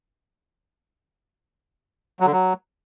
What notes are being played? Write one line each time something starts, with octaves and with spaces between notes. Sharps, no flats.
F#3
D3
F#3